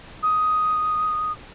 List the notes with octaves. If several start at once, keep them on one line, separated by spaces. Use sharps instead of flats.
D#6